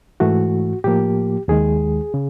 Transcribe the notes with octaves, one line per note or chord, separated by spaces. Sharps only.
G#2 E3 A3 F#4
A2 F3 A#3 G4
D#2 D#3 G#3 G#4
C#3